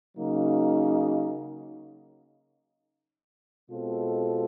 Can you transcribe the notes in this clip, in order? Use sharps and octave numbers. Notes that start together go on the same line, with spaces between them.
C#3 F#3 A#3 D#4
B2 G#3 C4 F4 A4